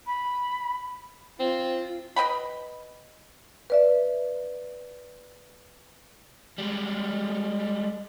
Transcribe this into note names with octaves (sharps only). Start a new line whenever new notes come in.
B5
C4 F4
B4 D#5 G5 B5
B4 D5 E5
G3 G#3